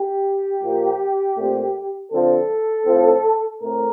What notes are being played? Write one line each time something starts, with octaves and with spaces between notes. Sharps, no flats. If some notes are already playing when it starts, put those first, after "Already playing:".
Already playing: G4
A#2 F3 A#3
A#2 A3 C4
D3 F3 C4 A4
A2 F3 C4
A2 A3 C4 A#4